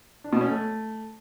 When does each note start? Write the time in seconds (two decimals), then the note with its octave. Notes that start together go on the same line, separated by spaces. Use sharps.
0.24 D4
0.33 B2
0.41 C#4
0.49 A3